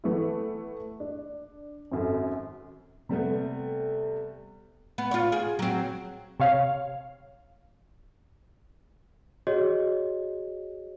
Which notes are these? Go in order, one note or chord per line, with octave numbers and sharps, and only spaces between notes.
E3 A3 B3 E4
D4
G#1 F#2 A4
C3 G3 A3 B3
B3
F4 C#5
G#4
F#3 C4
C3 C#5 F5
F#4 G#4 C#5 D#5